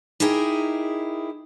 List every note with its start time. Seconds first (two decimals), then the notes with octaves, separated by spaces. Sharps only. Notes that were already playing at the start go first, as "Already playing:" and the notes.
0.20 D#4 E4 G4 G#4 A#4